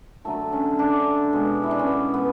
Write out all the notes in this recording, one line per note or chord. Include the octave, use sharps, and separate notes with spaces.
D3 F#3 A3 A4
C#4
D4
B2 G#3
E4
D4
C#4
B3
B3